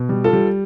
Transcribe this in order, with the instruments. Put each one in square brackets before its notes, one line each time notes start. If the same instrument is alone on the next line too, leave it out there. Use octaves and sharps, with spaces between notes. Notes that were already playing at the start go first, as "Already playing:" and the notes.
Already playing: [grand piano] B2
G3
F4 A4
G3